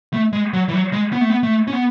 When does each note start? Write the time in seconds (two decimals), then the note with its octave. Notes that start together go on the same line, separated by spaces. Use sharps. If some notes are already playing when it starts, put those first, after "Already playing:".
0.13 A3
0.33 G#3
0.53 F#3
0.68 E3
0.73 F#3
0.93 G#3
1.13 B3
1.21 A3
1.30 B3
1.43 A3
1.68 C#4
1.73 B3